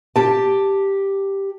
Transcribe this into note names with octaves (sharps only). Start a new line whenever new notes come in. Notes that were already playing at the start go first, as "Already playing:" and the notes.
G4 A5